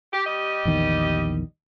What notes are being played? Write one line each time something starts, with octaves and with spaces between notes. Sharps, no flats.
G4
G3 G4 D#5
A#1 E2 D#3